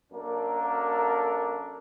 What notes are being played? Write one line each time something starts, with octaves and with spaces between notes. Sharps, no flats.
F#2 A#3 D4 A4 A#4